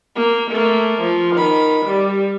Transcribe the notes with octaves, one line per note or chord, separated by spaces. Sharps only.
A#3
A3 A#3
F3
D#3 B5
G3